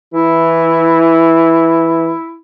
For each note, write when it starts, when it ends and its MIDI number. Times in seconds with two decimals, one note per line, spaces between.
0.14 2.12 52
0.14 2.38 64